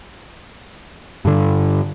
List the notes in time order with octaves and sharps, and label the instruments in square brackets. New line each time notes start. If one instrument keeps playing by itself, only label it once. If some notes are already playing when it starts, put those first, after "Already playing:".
[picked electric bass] G2 D3